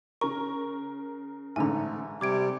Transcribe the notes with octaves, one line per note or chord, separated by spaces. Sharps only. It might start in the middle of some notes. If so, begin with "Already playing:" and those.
C#3 A#4 C#6
A1 G#2 D3 A3 G#5 A#5
C3 G3 D6 G#6 D7